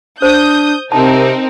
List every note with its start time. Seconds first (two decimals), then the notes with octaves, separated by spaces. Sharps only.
0.22 D4 C5 D#6 G6
0.92 C3 C4 D#4 A#4 A5